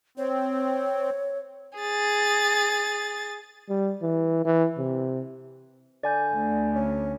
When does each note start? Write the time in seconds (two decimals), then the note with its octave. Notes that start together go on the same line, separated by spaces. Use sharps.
0.18 C4 C#5
1.79 G#4 A6
3.69 G3
4.02 E3
4.45 E3
4.78 C3
6.04 D3 D5 G#5 G6
6.35 D2
6.75 C#4